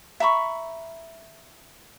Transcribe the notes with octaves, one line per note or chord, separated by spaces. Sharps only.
E5 A#5 B5 C#6